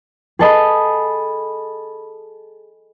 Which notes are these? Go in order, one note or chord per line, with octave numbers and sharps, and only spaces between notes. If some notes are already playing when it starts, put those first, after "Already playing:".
G#4 A4 D#5 B5